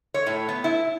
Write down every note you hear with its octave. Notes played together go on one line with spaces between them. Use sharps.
C#5
A2
B3
E4